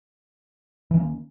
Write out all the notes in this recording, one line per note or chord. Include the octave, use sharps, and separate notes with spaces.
D#3 E3 A#3 C#4